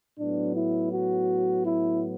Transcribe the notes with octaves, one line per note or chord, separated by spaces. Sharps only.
A2 F#3 B3 D4
E4
F#4
E4